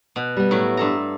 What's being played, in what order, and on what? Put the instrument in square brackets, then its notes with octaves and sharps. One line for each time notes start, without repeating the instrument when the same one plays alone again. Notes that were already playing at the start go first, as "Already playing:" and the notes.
[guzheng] B2
[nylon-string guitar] G3 B3
[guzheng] A2 F#3 E4
G2 A4 A#5